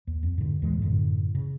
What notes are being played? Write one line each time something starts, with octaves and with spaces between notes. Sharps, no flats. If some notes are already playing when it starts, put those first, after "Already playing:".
D#2
F2
G#2 D3
D#2 A#2 E3 G#3
F#2 A2 D3
C#3